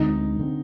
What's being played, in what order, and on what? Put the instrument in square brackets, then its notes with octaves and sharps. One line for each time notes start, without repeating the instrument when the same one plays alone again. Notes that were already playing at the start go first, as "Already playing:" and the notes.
Already playing: [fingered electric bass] D2 D3 G#3 C4 [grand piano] D#4
[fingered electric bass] D3 G#3 C4